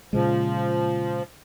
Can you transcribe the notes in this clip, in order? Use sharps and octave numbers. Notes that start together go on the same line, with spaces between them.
A#2 C#3 F3 G#3